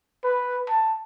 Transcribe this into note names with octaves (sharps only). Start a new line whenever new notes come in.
B4
A5